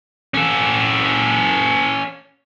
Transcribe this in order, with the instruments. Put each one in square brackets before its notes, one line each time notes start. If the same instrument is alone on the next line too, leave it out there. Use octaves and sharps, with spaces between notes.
[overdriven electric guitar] C#4 A4